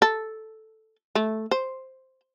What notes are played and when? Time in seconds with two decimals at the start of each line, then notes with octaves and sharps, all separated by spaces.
0.02 A4
1.15 A3
1.51 C5